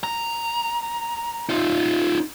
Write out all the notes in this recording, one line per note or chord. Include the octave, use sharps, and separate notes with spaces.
A#5
D#4 F4